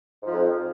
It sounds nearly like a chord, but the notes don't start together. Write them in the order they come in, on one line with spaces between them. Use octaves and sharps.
G#2 F3 F2